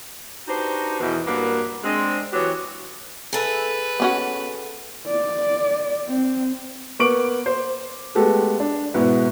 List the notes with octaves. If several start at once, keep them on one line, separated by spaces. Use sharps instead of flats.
D4 D#4 F#4 G4 B4 C5
E2 B2 D#3 E3
G2 F#3 A#3 B3 A#4 F#5
G#3 C4 D4
E3 F#3 B3 G4 C#5
G#4 A4 B4 E5
B3 C#4 F#4
D5
C4
A#3 B3 C#6 D6 D7 F#7
C5
G#3 A3 B3 G4 A4
D4
G#2 B2 B3 E4